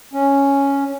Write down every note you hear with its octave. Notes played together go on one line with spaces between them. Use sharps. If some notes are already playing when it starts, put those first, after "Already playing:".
C#4